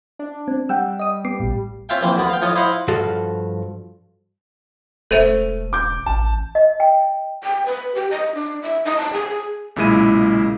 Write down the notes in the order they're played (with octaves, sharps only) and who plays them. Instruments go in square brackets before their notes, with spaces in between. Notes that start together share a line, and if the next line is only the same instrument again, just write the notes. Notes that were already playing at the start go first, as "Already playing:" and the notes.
[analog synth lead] D4
[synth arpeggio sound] C4
[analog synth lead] G3 [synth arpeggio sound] F#5 G5 E6
[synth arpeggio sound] D#5 D#6
B3 D6 C7
A#1 A2
[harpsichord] C4 C#4 F4 E5 F5 G5
A#1 C3 E3 C4
D2 D3 B3
F5 G5
A2 F3 F4 C#5 D#5
E4 C5 D#5 F5 F#5
[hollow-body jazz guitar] G2 F3 F#4 A4 F5
[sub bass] E1 [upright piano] A3 D#7 F7 [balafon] A4 C5 E5
[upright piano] D6 G6
[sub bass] A1 [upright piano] A5
[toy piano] D#5
G5
[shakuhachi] G5
B4
G4
D#5
D4
E5
D#4
A5
G#4
[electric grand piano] B1 A#2 C#3 G#3 E4 D#7